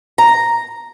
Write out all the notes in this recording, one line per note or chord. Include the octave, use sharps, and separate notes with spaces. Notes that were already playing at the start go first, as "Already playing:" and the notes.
A#5